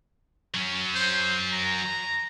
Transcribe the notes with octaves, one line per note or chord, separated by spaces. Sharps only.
F#3 C#4
C5
A#5